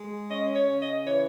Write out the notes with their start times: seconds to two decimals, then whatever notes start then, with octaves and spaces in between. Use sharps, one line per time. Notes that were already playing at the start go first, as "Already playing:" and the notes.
Already playing: G#3
0.30 C#4 D#5
0.55 C#5
0.67 C#3
0.81 D#5
1.06 E3 C#5